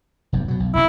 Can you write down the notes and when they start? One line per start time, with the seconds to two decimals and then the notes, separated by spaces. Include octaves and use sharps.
0.33 F1 B1 G2
0.48 B2 F#3
0.60 B1
0.75 F1 D#3 C#4 E4